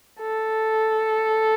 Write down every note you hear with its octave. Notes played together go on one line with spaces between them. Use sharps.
A4